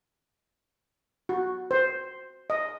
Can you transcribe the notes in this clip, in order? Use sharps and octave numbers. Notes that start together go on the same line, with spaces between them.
F#4
C5
D#5